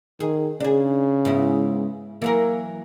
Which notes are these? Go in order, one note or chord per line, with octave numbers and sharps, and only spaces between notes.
D#3 G#4
C#3 D4 G#4
G#2 B3 E4
E3 F#3 A#3 A#4